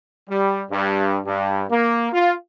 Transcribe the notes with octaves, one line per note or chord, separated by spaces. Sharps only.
G3
G2
G2
A#3
F4